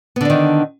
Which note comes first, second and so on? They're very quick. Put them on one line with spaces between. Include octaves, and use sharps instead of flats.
B3 D3 D4 D#3